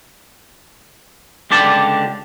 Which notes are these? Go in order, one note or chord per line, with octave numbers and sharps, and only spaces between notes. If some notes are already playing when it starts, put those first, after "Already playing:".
C#2 D3 G4 D5 A5